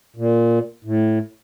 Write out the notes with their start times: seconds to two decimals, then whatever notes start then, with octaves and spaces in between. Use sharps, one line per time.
0.16 A#2
0.84 A2